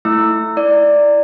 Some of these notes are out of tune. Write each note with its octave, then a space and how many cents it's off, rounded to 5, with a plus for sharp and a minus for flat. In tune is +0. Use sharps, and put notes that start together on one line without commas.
A3 +0 E4 +0 E6 +0
E4 +0 D5 +0